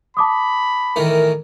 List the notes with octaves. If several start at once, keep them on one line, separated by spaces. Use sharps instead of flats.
A5 B5 D6 D#6
A2 D#3 E3 A#4